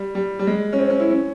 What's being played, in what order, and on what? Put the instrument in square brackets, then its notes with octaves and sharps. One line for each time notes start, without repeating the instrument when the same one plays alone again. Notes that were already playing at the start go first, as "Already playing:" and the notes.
Already playing: [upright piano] G3
G3
G3
G#3
C#4
C4
C#4
E4
C#4